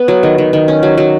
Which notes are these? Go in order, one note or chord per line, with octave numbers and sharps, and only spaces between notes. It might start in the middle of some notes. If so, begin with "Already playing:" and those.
Already playing: B3
F#3
D#3
D#3
D#3
C#4
F#3
F#3